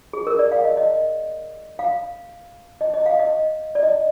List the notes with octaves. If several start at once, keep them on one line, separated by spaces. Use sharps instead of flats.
G#4
A#4
D5
F5
D#5
D#5
F5
D#5
D#5
F5
D#5
D5
D#5